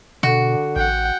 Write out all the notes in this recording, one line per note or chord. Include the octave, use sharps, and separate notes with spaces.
B2 D3 F#4
A1 F#5 G5